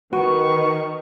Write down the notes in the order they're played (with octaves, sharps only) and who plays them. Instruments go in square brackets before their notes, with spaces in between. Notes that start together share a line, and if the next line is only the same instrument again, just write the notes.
[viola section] D#3 [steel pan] F#4 [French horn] B4 [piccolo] C#6